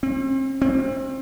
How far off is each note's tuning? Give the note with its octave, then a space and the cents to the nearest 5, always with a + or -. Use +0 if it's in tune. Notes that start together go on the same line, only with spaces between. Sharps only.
C4 +40
C4 +30